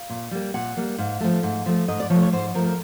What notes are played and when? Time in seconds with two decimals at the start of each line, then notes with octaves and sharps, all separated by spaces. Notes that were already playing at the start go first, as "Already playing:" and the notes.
Already playing: F5
0.10 A#2
0.31 G3 A#3
0.54 A#2 F#5
0.77 G3 A#3
0.98 G#2 F5
1.20 F3 A3
1.43 G#2
1.66 F3 A3
1.88 G#2 D#5
2.00 D5
2.10 F3 C#5
2.14 A3
2.22 C#5
2.32 G#2 C5
2.55 F3 A#4
2.58 A3
2.66 A#4